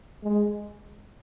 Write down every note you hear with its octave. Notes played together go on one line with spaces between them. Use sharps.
G#3